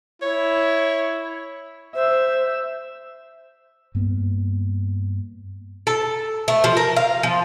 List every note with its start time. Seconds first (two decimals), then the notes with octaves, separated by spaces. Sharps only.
0.22 E4 C#5
1.95 C5 E5
3.95 G2 A#3 B3
5.87 A4
6.48 A3
6.64 F3
6.77 A#4
6.96 F5
7.23 F3